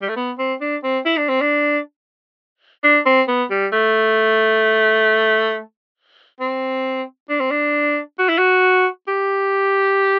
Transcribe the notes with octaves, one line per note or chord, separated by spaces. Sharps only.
G3
A3
B3
C4
D4
C4
E4
D4
C4
D4
D4
C4
B3
G3
A3
C4
D4
C4
D4
F#4
E4
F#4
G4